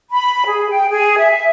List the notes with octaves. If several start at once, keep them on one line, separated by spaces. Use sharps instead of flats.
B5
G#4
G5
G#4
E5